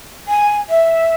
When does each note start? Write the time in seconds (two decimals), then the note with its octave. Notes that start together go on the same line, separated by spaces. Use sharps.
0.28 G#5
0.69 E5